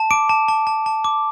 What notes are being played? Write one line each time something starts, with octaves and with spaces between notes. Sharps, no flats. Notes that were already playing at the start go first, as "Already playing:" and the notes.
Already playing: A5
D6 D7
A5
A5
A5
A5
D6